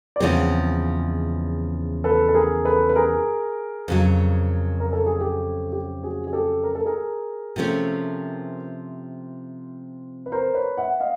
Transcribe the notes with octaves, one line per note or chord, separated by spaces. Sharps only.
D5
E2 C#3 F3 G#3 C4 B4 C#5
A4 B4
A4
G#4 A#4
A4 B4
B4
G#4 A#4
F2 C#3 F#3
A#4
A4
G#4
G4 A4
G4
F#4 G#4
G#4
G4 A4
A#4
A4
G#4 A#4
C3 F3 A3 C#4
B4
A#4 C5
B4 C#5
E5 F#5
D#5 F5